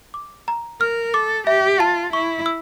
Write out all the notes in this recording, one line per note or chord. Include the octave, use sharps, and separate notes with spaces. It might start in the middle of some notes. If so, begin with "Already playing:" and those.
D6
A#5
A#4 F6
A4 D6
G4 E5
F4 A5
E4 C#6
E6